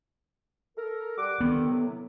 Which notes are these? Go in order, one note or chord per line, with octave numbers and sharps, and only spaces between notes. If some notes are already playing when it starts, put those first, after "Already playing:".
A4 A#4
G3 F#5 D6
D3 D#3 B3
A2 C3 F#3